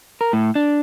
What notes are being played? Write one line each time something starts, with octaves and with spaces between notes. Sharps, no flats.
A#4
A2
D4